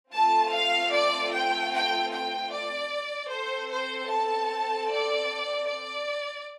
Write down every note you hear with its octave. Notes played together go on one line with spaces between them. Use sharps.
A3 C4 F4 A4 A5
F5
D5
G5
G5
G5
D5
C4 A4 C5
C5
A5
D5
D5